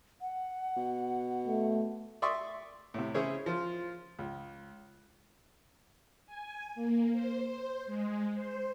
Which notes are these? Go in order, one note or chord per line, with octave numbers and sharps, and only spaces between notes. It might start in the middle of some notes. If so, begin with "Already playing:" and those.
F#5
B2
A3
D5 E5 C6 C#6 D#6
A2 C3
C#3 E4 G#4 C5 C#5
F3 F4
C#2
G#5
A#3
C5
C5
G#3
C5